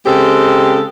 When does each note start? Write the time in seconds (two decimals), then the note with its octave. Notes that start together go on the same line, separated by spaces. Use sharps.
0.05 C#3 G#3 C4 G4 A4